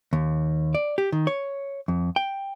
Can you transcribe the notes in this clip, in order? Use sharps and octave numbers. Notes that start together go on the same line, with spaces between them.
D#2
D5
G4
D#3
C#5
F2
G5